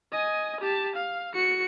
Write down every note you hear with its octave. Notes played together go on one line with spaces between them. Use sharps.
D#5 G#5
G4 A5
F5
F#4 C#7